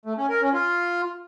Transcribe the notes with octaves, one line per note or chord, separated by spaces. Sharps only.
A3
C#4
A#4
C#4
F4